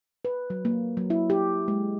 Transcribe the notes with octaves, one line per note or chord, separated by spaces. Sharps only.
B4
F#3
A#3
F#3
E4
G4
G#3